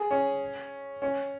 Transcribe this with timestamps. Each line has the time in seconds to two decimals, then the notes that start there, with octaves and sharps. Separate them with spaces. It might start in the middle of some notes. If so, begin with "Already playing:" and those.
Already playing: G#4
0.11 C#4
1.02 C#4